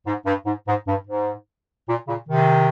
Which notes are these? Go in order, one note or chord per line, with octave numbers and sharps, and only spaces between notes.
G#2
G2
G#2
G#2
G2
G#2
A#2
A#2 C#3
C3 D#3